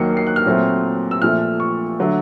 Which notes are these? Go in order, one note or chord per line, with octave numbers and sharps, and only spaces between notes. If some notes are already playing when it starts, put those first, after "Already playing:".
Already playing: D#2 D#3 F#3 A#3 C7 C#7
C7
F#6
F6
A#2 F#3 A3 C4
E6
A#2 F3 A3 F6
C#6
D3 F#3 A3